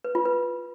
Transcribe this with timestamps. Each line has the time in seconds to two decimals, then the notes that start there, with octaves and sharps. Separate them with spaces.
0.04 B4
0.15 F4
0.25 B4